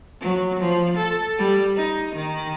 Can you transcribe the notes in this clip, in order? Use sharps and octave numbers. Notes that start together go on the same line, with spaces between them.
F#3
F3
A4
G3
D#4
D#3